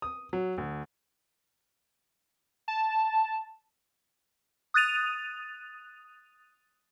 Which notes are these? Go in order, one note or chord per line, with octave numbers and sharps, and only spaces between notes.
D#6
F#3
D2
A5
D#6 F#6 A6 D#7 F7